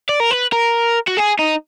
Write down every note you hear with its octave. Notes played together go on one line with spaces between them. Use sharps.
D5
A#4
B4
A#4
F#4
G#4
D#4